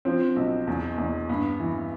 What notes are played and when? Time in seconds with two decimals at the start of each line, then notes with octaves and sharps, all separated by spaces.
0.05 F3 C4
0.36 B1
0.67 E2
0.98 E2
1.29 G2 B3
1.60 E3